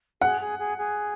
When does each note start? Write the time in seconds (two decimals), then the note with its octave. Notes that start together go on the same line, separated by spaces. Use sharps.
0.21 G#4 F#5
0.40 G#4
0.59 G#4
0.77 G#4